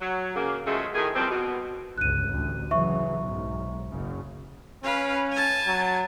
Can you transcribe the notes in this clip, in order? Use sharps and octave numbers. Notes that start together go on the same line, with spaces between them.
F#3
C#3 A#3
C#3 F3 F#3 G#3 A3 G#4
A2 D#3 G#4
F#2 F3 G3 B3 C4
B2
G1 C#2 F#6 D#7
A1 D2
C#3 E3 F#3 E5 C#6
B1 G#2
F#1 F#2 C#3
C#4 B4 F5
G#5 A5
F#3